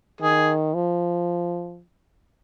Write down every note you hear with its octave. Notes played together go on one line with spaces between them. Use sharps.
D#3 G#4
F3